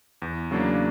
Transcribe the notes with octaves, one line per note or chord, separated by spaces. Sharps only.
E2
C#3 F#3 A#3 D4